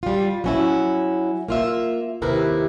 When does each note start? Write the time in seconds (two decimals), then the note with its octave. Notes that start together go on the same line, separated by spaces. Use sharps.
0.03 G3 F4
0.44 F#3 C#4 E4
1.48 A#3 F4 E5
2.22 D#2 C3 E4 A#4 B4